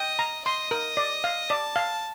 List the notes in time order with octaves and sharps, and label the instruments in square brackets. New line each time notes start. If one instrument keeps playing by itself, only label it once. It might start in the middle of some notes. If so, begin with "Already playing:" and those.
Already playing: [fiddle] D#5 [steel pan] G5
[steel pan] A#5
[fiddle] D#5 [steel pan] C6
[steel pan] A#4
D5
F5
[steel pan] D5 [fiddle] A5
[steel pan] F5